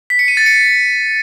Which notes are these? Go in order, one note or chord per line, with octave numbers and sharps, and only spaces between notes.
B6
C#7
D#7
A6
C#7